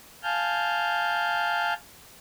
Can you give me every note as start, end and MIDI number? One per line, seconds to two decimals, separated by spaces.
0.23 1.73 77
0.23 1.73 80
0.23 1.73 81
0.23 1.73 89
0.23 1.73 91